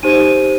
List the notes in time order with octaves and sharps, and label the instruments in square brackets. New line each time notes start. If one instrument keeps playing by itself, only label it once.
[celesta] D#4 G4 C5 D#7